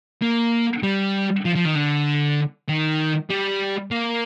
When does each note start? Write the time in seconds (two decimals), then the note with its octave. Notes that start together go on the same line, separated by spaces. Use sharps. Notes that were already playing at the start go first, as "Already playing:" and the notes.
0.22 A#3
0.83 G3
1.45 F3
1.55 F3
1.65 D#3
1.75 D3
2.69 D#3
3.30 G3
3.91 A#3